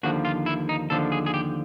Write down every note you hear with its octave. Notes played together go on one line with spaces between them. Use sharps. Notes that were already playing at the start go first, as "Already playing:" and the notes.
D#2 D3 F3 F#4
F4
E4
D#4
D#2 D3 F3 A4
G#4
G#4
G4